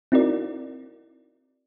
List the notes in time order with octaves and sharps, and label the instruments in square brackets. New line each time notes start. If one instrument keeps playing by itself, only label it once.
[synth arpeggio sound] C4 D#4 E4 F#4 A#4 D5